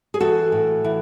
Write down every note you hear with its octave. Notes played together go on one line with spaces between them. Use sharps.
G#4
E3 F#4 A4
A2
E3